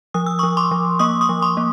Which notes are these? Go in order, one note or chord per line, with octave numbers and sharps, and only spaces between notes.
F3 D#6
E6
F3 C#6 D#6
C6 D6
F3
A#3 C#6 D#6
C#6 D#6
F3
C6 D6
A#3